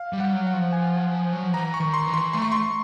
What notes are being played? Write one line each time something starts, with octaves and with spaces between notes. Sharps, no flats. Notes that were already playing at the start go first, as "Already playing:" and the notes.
Already playing: F5
G3
F#5
F#3
F#5
F3
G#5
F#3
F3
E3 A#5
C#6
D#3
C6
E3
C6
A3 C6
C#6
C6